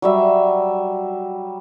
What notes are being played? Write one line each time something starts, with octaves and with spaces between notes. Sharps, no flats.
F#3 G3 E5